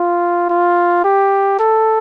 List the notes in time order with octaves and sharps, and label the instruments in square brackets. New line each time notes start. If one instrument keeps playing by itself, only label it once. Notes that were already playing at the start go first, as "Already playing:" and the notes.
Already playing: [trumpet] F4
F4
G4
A4